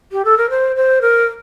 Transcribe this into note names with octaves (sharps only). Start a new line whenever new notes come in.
G4
A4
A#4
C5
C5
A#4